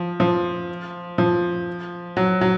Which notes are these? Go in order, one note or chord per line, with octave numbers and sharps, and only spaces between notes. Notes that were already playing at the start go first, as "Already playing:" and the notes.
Already playing: F3
F3
F3
F#3
F#3